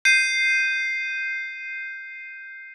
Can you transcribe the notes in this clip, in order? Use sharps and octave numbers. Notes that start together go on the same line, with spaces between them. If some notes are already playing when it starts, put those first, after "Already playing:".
G6 C7 D#7